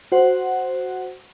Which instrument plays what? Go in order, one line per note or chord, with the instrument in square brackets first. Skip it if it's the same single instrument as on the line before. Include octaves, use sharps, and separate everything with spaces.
[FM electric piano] F#4 C5 F#5